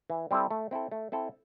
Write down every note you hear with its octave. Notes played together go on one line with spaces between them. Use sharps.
E3
G3 C4 E4 A4
A3
C4 E4 A4
A3
C4 E4 A4